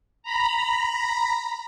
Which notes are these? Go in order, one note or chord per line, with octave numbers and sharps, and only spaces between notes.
A#5 B5